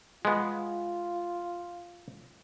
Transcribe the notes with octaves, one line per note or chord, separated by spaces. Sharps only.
G#3 B3 F4